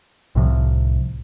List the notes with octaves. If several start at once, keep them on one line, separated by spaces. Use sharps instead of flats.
C2 A2 C3 F3